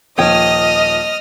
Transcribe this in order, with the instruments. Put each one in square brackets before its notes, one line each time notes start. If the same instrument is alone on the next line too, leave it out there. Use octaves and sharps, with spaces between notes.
[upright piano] D#1 F3 [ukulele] C#5 G5 [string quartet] D#5 [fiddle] D#6 F6